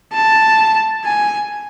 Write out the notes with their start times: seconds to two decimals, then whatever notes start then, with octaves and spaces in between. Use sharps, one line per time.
0.14 A5
1.05 G#5